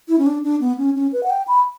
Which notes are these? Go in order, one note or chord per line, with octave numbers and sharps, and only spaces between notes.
E4
C#4
D4
D4
B3
C#4
C#4
B4
F#5
G5
B5